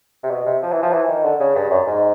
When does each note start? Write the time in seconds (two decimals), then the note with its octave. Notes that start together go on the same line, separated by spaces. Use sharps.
0.23 C3
0.31 B2
0.46 C3
0.62 F3
0.72 E3
0.83 F3
0.93 E3
1.08 D#3
1.24 D3
1.40 C#3
1.55 G2
1.70 F#2
1.87 G#2